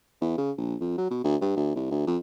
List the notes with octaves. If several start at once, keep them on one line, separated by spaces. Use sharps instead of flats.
E2
C#3
A#1
F2
F#3
B2
D2
G2
D2
C2
D2
F2